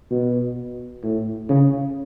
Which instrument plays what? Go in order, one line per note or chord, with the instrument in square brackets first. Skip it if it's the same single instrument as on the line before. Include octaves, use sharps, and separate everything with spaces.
[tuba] B2
A2
C#3